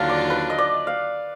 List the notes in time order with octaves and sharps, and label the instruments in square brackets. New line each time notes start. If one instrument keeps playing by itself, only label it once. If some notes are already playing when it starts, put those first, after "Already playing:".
Already playing: [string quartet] D#2 D3 F#3 D4 F4 [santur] F5
[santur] D5
B4
D#5
D5
F5